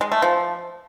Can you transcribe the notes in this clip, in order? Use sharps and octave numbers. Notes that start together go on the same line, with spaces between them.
G#3
A3
F3